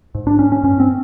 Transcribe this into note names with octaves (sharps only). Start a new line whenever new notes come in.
G#2
D4
C#4
C#4
G2 C#4
C4